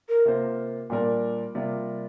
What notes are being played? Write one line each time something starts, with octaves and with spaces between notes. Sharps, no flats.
A#4
C3 A#3 F4 C5
A#2 G3 D4 A#4 D5
C3 G3 A#3 F4 D5